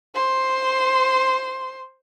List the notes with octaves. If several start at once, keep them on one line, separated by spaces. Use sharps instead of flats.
C5 C6